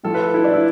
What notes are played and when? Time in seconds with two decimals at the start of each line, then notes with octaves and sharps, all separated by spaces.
0.03 A2 F3 A3 A4
0.14 B4
0.24 A4
0.34 E4
0.44 D4
0.54 E4